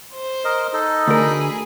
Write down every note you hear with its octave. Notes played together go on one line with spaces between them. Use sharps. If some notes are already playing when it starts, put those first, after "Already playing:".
C5
A#4 D#5
D#4 A4 D#5
D2 G#4 A#4 B5